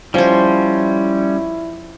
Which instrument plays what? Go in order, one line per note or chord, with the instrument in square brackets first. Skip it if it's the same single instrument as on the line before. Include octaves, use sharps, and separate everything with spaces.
[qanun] F3 C5 [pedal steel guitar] G3 C#4 [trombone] E4